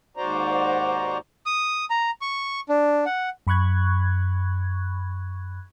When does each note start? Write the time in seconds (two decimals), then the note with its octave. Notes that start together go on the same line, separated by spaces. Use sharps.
0.17 D#2 G#2 F#4 C5 D5 A#5
1.46 D#6
1.90 A#5
2.21 C#6
2.69 D4
3.06 F#5
3.47 F#2 B5 C#6 F#6 G#6